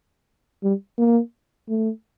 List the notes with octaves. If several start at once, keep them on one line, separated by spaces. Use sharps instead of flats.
G3
A#3
A3